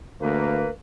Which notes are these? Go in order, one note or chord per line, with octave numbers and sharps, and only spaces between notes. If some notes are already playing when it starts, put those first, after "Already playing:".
D2 A#3 B4